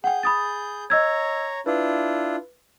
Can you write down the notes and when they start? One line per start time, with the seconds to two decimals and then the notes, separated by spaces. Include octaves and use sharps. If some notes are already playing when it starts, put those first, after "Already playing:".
0.04 G#4 F#5 G5 G6
0.23 B5 D#6 A6
0.90 C#5 D#5 A#5 E6 G#6
1.66 D4 E4 F4 B4